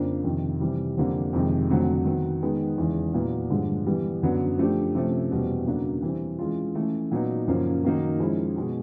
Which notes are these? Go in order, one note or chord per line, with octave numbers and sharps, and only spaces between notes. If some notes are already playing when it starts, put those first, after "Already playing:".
Already playing: F2 C#3 F3 A#3 D4
F2 C3 D#3
C3 E3 G3
F2 D3 G3 A#3
F2 C3 D#3 G#3
F2 D3 F#3 A3 C4
D#3 F#3 B3
D#3 G#3 B3 D#4
E2 C#3 E3 G#3 C#4
A#2 F#3 B3 E4
G2 D3 F3 G#3
E3 G3 B3
F#2 D3 F#3 B3 D4
F3 A3 D4 G4
C3 F3 A3 C#4
E2 B2 G3 C4
C#3 F#3 A#3 D4 F#4
E3 G3 C4
E3 G#3 C#4 F4
E3 A3 C#4
A#2 F#3 B3 D#4
F#2 C#3 F3 A#3 C#4
D#3 F#3 A#3 D#4
F3 G#3 C#4 E4
B2 G#3 C#4